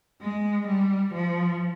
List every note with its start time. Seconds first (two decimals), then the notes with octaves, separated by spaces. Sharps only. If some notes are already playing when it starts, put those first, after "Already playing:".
0.21 G#3
0.68 G3
1.14 F3